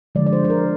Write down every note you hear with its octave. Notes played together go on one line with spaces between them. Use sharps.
D3 F3 G#3 D5
D5
C5
C5
A#4